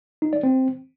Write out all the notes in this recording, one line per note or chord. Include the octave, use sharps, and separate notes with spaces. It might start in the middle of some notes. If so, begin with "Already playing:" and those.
D#4
D5
C4